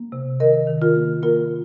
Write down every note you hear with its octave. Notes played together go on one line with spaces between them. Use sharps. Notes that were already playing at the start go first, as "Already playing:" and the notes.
Already playing: A#3
C3
D#3 A#4 D#5
D#3
F4 A#4
A#3
A#3 F4 A#4